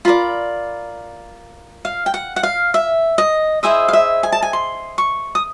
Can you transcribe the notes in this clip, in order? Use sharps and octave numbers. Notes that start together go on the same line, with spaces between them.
F4 A#4 D5 B5
F5
G5
F#5
F#5
F5
E5
D#5
E4 G#4 C5 D#5 E5
F5
E5
G#5
A5
G#5
C6
C#6
D#6